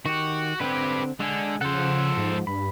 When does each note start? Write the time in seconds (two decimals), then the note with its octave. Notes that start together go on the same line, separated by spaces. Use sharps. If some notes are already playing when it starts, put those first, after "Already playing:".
0.06 D#3 F#4 G4
0.61 D3 C4 G4 B4
1.20 D3 G#3 G#5
1.61 C#3 F3 A4 C5 F#5
2.17 G#2
2.47 G2 B5